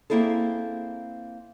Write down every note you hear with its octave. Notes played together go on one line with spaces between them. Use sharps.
A#3 C4 E4 G#4 A4